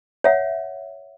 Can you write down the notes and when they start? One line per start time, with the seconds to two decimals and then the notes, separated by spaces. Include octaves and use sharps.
0.24 C#5 E5 F#5